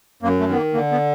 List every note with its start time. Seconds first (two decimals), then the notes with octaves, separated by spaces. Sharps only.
0.23 F#2 A#3
0.40 A3
0.48 D#3 B3
0.57 A#3
0.74 D3 A#3
0.92 B3